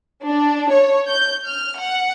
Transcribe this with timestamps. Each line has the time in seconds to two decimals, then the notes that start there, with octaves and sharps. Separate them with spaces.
0.24 D4
0.70 C#5
1.08 G6
1.46 F6
1.77 F#5